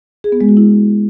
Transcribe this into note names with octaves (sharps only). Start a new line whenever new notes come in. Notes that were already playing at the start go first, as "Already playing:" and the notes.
G#4
B3
G#3
F#4
E4